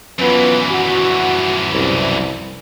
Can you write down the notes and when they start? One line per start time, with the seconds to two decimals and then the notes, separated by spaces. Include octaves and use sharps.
0.19 F#2 E3 B3 F4 B4
0.71 F#4
1.71 C2